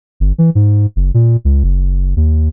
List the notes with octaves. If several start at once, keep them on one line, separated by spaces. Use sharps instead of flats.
G1
E3
G#2
F#1
A#2
C#2
F#1
D#2